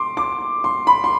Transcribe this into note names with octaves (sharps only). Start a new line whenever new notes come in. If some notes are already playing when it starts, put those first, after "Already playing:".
Already playing: C6 D6
D6
C6
B5
C6